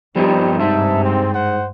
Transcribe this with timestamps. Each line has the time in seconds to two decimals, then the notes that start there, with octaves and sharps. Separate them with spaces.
0.16 G2 F3 G3 B3 C4 D#4 G4
0.59 G#2 C3 D#4 E5 A5
1.02 C4
1.35 C5 F#5